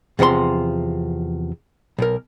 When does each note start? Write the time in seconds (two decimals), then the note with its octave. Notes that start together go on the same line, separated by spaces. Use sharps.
0.19 E2 C3 F3 C#5 C6
1.99 B1 A#4